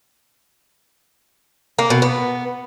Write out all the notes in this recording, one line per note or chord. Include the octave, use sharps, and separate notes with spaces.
A#3
B2
B3